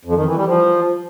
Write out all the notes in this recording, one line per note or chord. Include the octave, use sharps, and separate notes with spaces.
F2
D#3
E3
G3
F3